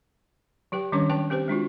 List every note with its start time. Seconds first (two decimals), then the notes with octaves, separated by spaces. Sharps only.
0.72 F#3 G4 B4 G5
0.92 D#3 G3 C#4 D4 C#5 D6
1.10 F#3 B4 G5 A5
1.30 C4 G4 B4 C5
1.48 G#3 D4 F4 F#4